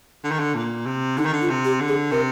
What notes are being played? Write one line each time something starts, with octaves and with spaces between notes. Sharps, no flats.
D3
D#3
D3
A#2
C3
D3 D#4
D#3
D3
F4
C3
G4
D3
G#4
C3 A#4